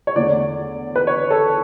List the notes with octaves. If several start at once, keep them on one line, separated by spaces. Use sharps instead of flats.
C#5
E2 D3 A3 D5
B4
C#5
A4